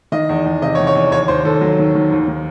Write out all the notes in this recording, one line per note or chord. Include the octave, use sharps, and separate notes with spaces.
D#3 D#5
E2
E2
C3 D#5
C#5
E2
C#5
E2
D#2 C#5
D#2 C5
D#2 A4
F#3
D#3
D#3
D#2
D#3